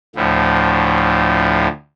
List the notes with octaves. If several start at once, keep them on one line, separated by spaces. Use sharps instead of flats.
D2 A2 F3